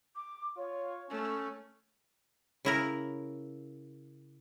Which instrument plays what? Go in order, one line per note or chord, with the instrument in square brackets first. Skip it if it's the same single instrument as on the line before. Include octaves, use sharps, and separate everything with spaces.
[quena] D6
[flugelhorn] F4 [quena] C#5
[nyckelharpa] A3 [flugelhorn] C#4
[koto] C#3 E4 A#4